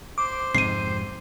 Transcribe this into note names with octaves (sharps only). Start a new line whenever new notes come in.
C5 D6
F2 G#2 C3 C7 D#7